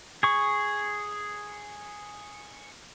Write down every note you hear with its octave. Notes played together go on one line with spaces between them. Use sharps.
G#4 C#6